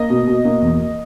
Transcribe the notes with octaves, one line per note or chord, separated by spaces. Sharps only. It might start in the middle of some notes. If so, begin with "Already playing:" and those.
Already playing: A#3 D#5
B2
B2
A#3
E2